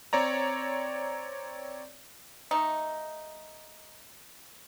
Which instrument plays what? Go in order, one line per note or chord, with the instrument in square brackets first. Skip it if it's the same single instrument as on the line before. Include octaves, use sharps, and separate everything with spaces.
[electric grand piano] C4 C#5 D5 A#5
[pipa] A3 D#4